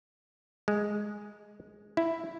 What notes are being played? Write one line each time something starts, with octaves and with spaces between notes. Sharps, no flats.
G#3
E4